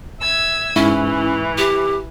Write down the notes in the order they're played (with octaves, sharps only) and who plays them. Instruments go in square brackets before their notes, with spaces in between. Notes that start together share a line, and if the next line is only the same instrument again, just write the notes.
[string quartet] E5 E6 G#6
[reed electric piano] G#2 E4 C#6 [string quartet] E3 [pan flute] C#4
[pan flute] G4